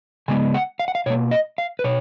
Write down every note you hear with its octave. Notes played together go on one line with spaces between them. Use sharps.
C#3 G#3 B3 G#5
F#5
F5
F#5
F5
B2 A#3 C#5
D#5
F5
B4
B2 C#5